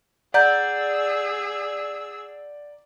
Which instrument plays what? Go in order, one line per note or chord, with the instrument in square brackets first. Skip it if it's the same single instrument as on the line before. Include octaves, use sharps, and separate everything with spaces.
[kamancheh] G#4 E6 [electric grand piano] D5 [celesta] F#5 A#5 G6